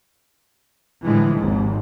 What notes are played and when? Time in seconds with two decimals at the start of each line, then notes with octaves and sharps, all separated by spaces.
1.04 A2 D3 E3 F3 G#3
1.36 G#1 D#2 G#2